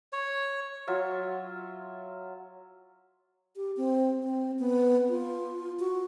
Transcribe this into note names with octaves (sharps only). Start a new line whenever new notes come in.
C#5
F#3 F4 E5
G4
C4
C4
B3
F4
F#4